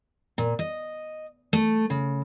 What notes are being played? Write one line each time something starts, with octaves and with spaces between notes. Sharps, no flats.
A#2
D#5
A3
C#3